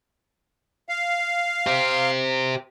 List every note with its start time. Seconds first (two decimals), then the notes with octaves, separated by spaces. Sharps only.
0.89 F5
1.67 G4 C5